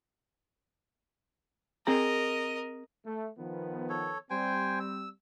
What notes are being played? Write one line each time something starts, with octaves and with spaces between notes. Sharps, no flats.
C4 G#4 A#4 D#5 A#5
A3
D#3 F3 B3
A4 C#5
G3 C4 C5 G5 G#5
E6